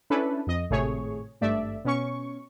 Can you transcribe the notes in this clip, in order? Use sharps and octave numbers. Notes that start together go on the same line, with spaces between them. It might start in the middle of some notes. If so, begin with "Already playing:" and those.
C#4 D4 E4 A4 B4
F2 D#5
G#1 A2 C3 A3 G#4 C#5
G#1 G2 A3 D5 E5
B2 C#4 C#6